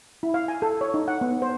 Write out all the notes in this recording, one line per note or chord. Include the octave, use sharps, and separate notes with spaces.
E4
F5
G#5
A4
C#5
D#4
F#5
B3
C5